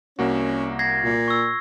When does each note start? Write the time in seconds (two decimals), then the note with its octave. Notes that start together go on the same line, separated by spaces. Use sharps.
0.19 C2 A#3 C#4 F#4
0.79 G#6 A#6 C7
1.02 A#2
1.28 C#6 E6